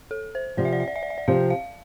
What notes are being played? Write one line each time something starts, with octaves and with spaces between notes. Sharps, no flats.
A4
C5
C3 F3 C4 D5
E5
D5
E5
D5
E5
D5
E5
D5
C3 F3 C4 F5
F5